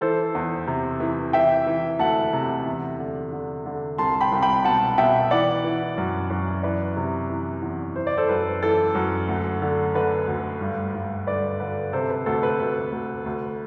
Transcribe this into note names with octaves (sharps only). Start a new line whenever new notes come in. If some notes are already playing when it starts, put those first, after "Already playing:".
E3 A4 C5
E2
C3
E3
E3 E5 G5
E3
D2 F#5 A5
C3
E2
D3
D3
D3
C2 A5 C6
G5 B5
C2
G5 B5
B2 F#5 A5
B2 E5 G5
E3 D5 F#5
E3
F#2
F#2
E3 B4 D5
C3
E3
E2
E3 C5
D5
A4 C5
F#2 B4
E3 A4
F#2
D2
D3
D3 B4
D2
G2
G2
D3 B4 D5
D3 B4
C3 A4 C5
B4
D2 A4
B4
D2
D2
D2